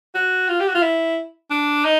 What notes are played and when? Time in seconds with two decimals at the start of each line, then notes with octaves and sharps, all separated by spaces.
0.15 F#4
0.49 F4
0.60 G4
0.68 F#4
0.75 F4
0.82 E4
1.50 D4
1.85 D#4